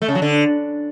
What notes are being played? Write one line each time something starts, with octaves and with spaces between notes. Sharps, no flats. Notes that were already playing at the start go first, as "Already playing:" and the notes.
A3
C#3
F#3
D3